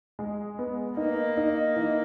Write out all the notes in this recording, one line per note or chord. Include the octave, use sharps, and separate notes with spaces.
G#3
B3
A#3 D#4
D#4
E3